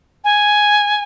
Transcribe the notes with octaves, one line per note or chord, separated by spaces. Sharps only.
G#5